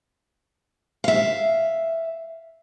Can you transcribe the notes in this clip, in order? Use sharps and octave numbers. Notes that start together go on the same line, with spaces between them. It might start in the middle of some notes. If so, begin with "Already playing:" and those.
E5 F5